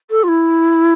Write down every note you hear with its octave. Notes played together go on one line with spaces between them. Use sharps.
A4
F4
E4